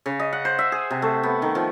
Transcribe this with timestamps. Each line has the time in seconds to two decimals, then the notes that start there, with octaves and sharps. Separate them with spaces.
0.06 C#3
0.20 D#5
0.33 F#5
0.45 C5
0.59 E5
0.72 G#4
0.91 C3
1.02 A3
1.23 B3
1.42 D#3
1.55 F3